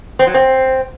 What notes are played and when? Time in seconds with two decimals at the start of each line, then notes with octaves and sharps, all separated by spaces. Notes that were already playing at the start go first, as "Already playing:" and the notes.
0.19 C4
0.27 F#3
0.34 C4